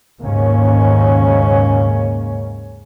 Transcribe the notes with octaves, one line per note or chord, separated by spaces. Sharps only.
D#2 G#2 C#3 A#3 C#4